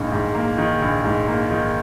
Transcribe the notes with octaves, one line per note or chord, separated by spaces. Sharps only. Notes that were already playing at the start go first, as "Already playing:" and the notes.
Already playing: A#1 G#2 D#3 A#3
G#2
A#3
D#3
A#1
G#2
A#3
D#3